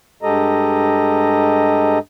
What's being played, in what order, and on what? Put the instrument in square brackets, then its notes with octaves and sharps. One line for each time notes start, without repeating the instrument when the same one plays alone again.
[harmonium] G2 G#3 G4 A4 D#5 A#5